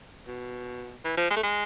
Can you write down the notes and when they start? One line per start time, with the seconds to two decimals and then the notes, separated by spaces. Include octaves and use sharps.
0.26 B2
1.05 E3
1.17 F3
1.30 G#3
1.36 A3
1.43 G#3